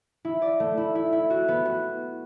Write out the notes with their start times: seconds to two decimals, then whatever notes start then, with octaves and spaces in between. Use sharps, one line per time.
0.25 E4
0.42 D5
0.60 A3
0.77 E4
0.95 E4
1.12 E4
1.30 F#4
1.48 B3
1.65 F#4